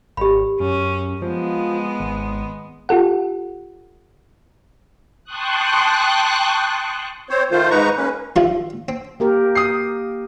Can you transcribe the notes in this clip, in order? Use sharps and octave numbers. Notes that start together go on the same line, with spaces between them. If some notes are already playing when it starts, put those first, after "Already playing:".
G#1 G4 B5
F#2 C#4
F3 G#3 B3
G#1
F4 G4 A4 F#5
G5 A5 C6 C#6 D#6 F#6
C4 C5 C#5
D#3 A3 F4 C5
G#2 D#4 B4 A#5 C#6
A#3 C#4 B4
D#3 F3 G3 E4 F4
C4
A#3 G4 A#4
D#6 C7